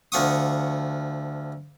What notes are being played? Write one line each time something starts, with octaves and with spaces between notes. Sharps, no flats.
D2 F3 F#5 C#6 D#6